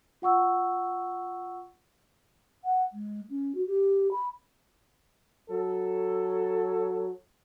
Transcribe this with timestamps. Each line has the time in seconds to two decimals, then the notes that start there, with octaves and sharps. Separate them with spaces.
0.22 F4 F#5 C#6 E6
2.64 F#5
2.93 G#3
3.30 C#4
3.55 F#4
3.66 G4
4.11 B5
5.50 F#3 A4